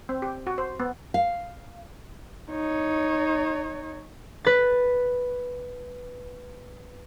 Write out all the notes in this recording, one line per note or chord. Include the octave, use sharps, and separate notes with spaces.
C4
G4
F#4
C5
B3
F5
D#4 C#5
B4 A6